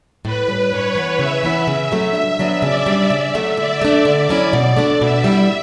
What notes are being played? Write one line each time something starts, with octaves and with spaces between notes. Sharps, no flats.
A2 B4
G3 C#4
G2 C#5
E3 B3
C#3 E5
E3 B3 E4
C#3 E5
F#3 A3
G2 E5
F#3 B3 D4
C#3 D5
G3 D4
C#3 E5
F#3 A3
D3 D5
A3 D4
D3
F#3 C#4 E4
B2
A3 D4
B2 E5
G3 B3 E4